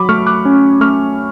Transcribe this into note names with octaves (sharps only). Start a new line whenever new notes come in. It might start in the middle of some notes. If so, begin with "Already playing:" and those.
Already playing: F#3 B5 D6
A3 C#6 F6
D6 F#6
C#4
A3 C#6 F6